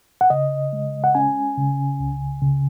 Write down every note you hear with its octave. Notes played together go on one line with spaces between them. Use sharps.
F#5
C#3 D#5
G#3
F#5
C#4 G#5
C#3
C#2
C#3